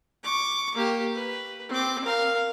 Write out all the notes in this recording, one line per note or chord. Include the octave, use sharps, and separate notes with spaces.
C#6 D6
A#3 G4
B4
C4 D6
A#4 F5